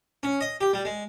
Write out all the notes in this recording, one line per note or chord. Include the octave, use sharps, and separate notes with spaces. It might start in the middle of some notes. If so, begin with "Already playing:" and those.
C#4
D#5
G4
G3
G#3